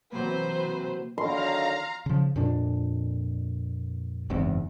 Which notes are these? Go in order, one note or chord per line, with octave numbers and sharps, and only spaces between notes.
C3 E3 F#3 A#3 C4 B4 C5
D3 D#3 F#3 F5 A#5 C6
C#3 F3
F2 A#2 D4
F#1 E2 G#2 C4